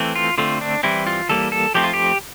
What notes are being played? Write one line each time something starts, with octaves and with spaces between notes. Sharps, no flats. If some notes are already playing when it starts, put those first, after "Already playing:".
Already playing: E3 A3 C4
F4
D3 A3 C4 F4
D4
E3 G3 C4 E4
F4
E3 G3 A#3 A4
A4
F3 A3 C4 G4
F4
G4